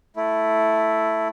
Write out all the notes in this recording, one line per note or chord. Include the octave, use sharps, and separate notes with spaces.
A3 E4